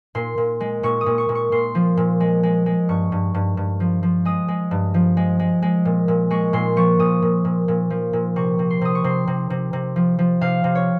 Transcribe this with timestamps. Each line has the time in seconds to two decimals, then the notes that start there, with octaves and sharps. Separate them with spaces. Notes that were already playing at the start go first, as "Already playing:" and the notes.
0.15 A#2 C6
0.38 A#2
0.60 G#3
0.83 A#2 C#6
1.01 D#6
1.06 A#2
1.18 C#6
1.29 A#2
1.35 C#6
1.52 A#2 C6
1.75 F3
1.97 A#2
2.20 G#3
2.43 G#3
2.66 G#3
2.89 G2 C#6
3.12 G2
3.34 G2
3.57 G2
3.80 F3
4.03 F3
4.25 G#3 D#6
4.48 G#3
4.71 G2
4.94 F3
5.17 G#3
5.39 G#3
5.62 G#3
5.85 A#2
6.08 A#2
6.31 G#3 C#6
6.53 A#2 C6
6.77 F3 C#6
6.99 A#2 D#6
7.22 A#2
7.45 A#2
7.68 A#2
7.90 F3
8.13 A#2
8.36 C3 C#6
8.59 C3
8.71 C6
8.81 C3 D#6
8.95 C#6
9.04 C3 C6
9.27 C3
9.50 C3
9.73 C3
9.96 F3
10.19 F3
10.41 C3 F5
10.64 C3
10.75 C#5